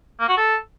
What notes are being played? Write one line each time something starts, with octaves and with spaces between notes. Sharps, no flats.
A#3
F#4
A4